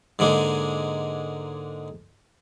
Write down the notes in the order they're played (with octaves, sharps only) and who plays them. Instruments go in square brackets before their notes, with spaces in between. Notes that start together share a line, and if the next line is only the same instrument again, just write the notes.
[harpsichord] G#2 D3 G#3 A#3